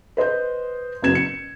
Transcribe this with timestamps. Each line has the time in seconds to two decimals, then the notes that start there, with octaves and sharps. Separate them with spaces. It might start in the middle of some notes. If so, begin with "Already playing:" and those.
0.17 B4 C5 D#5 G6
1.02 F#1 F#3 B3 G#6 E7
1.15 C#7